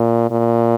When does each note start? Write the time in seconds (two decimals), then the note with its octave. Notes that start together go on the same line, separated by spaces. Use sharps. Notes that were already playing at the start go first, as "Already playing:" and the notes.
Already playing: A#2
0.31 A#2